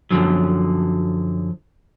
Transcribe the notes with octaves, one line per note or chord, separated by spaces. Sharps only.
F#2 A2 D3 F3 F#3